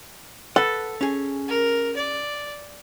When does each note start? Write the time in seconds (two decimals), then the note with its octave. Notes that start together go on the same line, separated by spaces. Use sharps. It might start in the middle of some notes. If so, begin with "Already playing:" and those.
0.56 A4 B4 F#5
1.01 C#4 G#4
1.48 A#4
1.97 D5